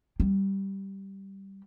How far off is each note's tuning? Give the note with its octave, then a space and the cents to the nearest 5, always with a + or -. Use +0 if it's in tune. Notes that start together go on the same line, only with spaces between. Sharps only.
G3 -10